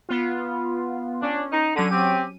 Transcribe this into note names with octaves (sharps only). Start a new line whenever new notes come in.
B3 F4
C#4 D4
D#4
D3 F#3 C#4 D#7
C4 G4